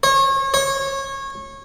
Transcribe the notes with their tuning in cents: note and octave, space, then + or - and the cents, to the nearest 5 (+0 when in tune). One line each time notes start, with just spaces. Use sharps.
C#5 -35
C#5 -25